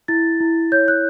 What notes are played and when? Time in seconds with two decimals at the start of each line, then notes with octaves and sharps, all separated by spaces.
0.08 E4 A6
0.40 E4
0.72 C#5 G6
0.88 F#6